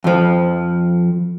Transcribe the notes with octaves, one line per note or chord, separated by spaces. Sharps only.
F2 F3